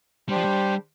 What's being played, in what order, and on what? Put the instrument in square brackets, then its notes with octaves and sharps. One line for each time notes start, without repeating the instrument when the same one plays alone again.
[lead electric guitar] G3 [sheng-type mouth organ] D4 G4 C5
[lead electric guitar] F3
G3